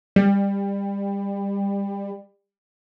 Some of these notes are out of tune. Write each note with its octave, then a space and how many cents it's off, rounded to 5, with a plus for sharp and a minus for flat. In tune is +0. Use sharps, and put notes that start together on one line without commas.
G3 +25